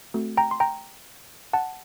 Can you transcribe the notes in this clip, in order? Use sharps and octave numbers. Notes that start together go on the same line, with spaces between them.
A3 C4 F#4 A4
G5 A#5
C6
G5 A#5
F#5 A5